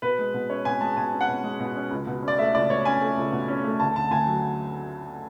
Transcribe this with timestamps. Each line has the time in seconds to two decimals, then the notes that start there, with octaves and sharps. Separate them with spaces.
0.02 B2 B4
0.19 G#3
0.34 B2
0.50 C#4 C#5
0.65 B2 G#5
0.81 G#3 A5
0.97 B2 G#5
1.13 C#4
1.21 F#5
1.28 B2
1.44 G#3
1.60 B2
1.75 C#4
1.91 C#2
2.07 B2
2.23 C#4
2.28 D5
2.38 A3 E5
2.54 C#2 D5
2.70 B2 C#5
2.85 C#4 G#5
3.02 A3
3.17 C#2
3.32 B2
3.48 C#4
3.64 A3
3.80 D2 A5
3.96 D3 A5
4.11 D2 G#5
4.27 F#3